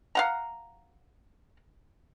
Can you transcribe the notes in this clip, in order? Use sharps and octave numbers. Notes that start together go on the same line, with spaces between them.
F5 F#5 A#5